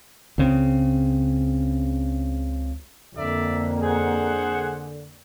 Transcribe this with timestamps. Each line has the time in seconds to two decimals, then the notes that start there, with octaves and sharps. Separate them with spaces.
0.38 C#2 C#3 C4
3.15 F2 D3 A#3 D5 E5
3.81 G#4 C5 F#5